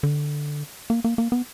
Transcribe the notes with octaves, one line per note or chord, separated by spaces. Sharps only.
D3
A#3
A#3
A#3
B3